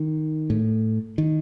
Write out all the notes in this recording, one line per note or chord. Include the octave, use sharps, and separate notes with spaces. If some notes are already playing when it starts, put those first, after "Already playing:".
Already playing: D#3
A2
D#3